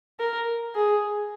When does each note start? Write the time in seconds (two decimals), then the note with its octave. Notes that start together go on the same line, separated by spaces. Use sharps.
0.19 A#4
0.74 G#4